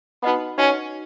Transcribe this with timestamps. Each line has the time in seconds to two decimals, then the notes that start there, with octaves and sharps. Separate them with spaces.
0.23 B3 D#4 F#4 B4 D#5 F#5
0.58 C#4 D#4 F#4 B4 D#5 F#5